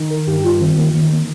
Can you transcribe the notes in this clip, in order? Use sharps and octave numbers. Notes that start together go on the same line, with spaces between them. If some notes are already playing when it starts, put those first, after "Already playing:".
Already playing: D#3
A#4
G2 G4
G4
F4
D#3 C4
A#3
D#3 A#3
A#3